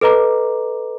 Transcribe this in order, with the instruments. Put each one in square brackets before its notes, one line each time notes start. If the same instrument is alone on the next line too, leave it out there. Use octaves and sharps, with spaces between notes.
[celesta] A4 B4 D#5 A#5 D6